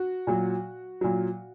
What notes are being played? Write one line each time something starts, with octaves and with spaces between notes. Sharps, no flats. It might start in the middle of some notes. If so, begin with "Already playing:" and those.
Already playing: F#4
A#2 F#3
A#2 F#3